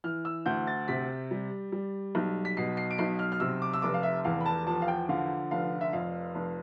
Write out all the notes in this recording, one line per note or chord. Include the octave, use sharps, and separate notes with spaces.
E3 F6
E6
D2 G6
A6
C3 B6
G3
G3
B1
B6
B2 C7
C7
D7
B1 C7
F6
F6
C3 E6
D6
E6
F1 D6
F5
E5
E2 F5
B5
A5
F3 A5
F5
G5
D3 F5
F1 F5
E5
F2 F5
F1